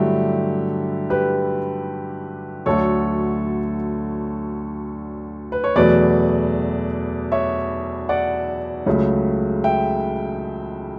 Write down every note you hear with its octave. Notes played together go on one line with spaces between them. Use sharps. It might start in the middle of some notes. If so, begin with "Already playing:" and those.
Already playing: G2 D3 F#3 A3 E4 G4
G4 B4
D2 D3 F#3 A3 A4 C#5
B4
C#5
E2 B2 F#3 A3 B4 D5
C#5 E5
D5 F#5
C#2 C#3 F#3 A3
E5 G5